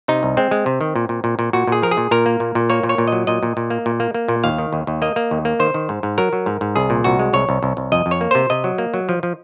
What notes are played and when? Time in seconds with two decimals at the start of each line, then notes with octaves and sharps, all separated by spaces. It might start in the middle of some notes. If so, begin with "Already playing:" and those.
0.08 C3 D#4
0.23 C2
0.37 G#3 C4
0.51 G#3
0.66 C3
0.81 D#3
0.96 A#2
1.09 A#2
1.24 A#2
1.39 A#2
1.53 A#2 F#4
1.67 A#2 G#4
1.82 F3 A#4
1.91 G#4
1.97 A#2
2.11 A#2 A#4
2.26 A#3
2.40 A#2
2.55 A#2
2.70 A#3 C#5
2.83 A#2
2.89 C#5
2.98 A#2
3.08 F#3 D#5
3.27 A#2 D#5
3.43 A#2
3.57 A#2
3.70 A#3
3.86 A#2
4.00 A#3
4.14 A#3
4.28 A#2
4.44 D#2 F5
4.58 D#3
4.73 D#2
4.87 D#2
5.02 A#3 D#5
5.16 A#3
5.31 D#2
5.45 A#3
5.60 D#3 C5
5.74 D#3
5.89 G#2
6.03 G#2
6.18 F#3 A#4
6.33 F#3
6.46 G#2
6.61 G#2
6.76 C2 G#4
6.90 A#2
7.04 C2 F#4
7.19 G#3
7.33 C2 C#5
7.49 C2
7.63 C2
7.77 C2
7.92 F2 D#5
8.06 F2
8.11 C#5
8.21 A#3
8.31 C3 C5
8.50 C3 D#5
8.64 F#3
8.78 A#3
8.94 F#3
9.09 F3
9.23 F3